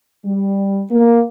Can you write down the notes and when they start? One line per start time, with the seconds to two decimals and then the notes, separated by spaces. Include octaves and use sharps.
0.25 G3
0.91 A#3